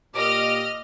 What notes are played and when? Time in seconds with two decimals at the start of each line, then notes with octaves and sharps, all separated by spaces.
0.15 A#2 A#3 G4 D#5 D6 F6 A#6